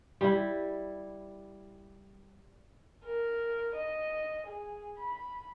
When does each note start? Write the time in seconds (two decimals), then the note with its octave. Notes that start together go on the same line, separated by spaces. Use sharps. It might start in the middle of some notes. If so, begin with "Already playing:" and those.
0.21 G3 E4
3.04 A#4
3.75 D#5
4.47 G#4
4.98 B5